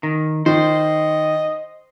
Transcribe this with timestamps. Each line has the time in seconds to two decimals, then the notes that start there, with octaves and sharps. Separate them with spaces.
0.03 D#3
0.46 D#3 C5 D#5